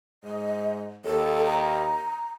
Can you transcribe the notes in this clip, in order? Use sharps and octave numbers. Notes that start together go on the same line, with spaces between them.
G#2 D#5
D#2 A4
A#5